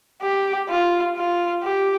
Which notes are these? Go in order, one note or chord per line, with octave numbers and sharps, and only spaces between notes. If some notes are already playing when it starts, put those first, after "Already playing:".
G4
F4
F4
G4